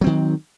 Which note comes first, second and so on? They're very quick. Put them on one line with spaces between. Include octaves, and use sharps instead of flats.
F#3 C4 D#3